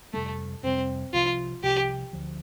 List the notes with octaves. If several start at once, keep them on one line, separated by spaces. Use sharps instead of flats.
F2 C3 G3 A3
F2 C3 G3 C4
C2 C3 F3 F4
C2 C3 F3 G4
D2 D3 F3